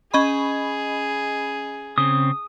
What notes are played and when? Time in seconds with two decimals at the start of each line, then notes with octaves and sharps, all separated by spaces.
0.14 C#4 G#4 D#5 B5
1.98 C#3 C4 D#6